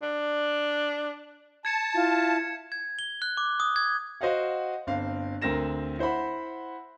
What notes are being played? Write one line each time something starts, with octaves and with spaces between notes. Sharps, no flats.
D4
A5 G#6 C#7 E7
E4 F4
G#6
G7
F#6
D6
D#6
G#6
F#4 C5 D#5 F5 F#5
G1 C4 F5
D2 C4 A#4 A#6 E7
E4 C5 F#5 B5